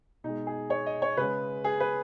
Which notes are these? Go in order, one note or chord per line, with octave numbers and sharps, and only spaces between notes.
B2 G#3 D#4
G#4
C#5
D#5
C#5
C#3 G#3 B4
G#4
B4